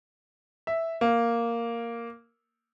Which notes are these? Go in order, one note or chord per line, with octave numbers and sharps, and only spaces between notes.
E5
A#3